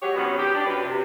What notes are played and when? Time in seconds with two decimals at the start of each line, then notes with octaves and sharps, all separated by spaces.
0.01 F#3 G#3 G4 C#5
0.16 C3 D#3 F#3 G3 B3 C#4
0.38 G4
0.54 D4 G4
0.65 F#2 B4
0.84 C3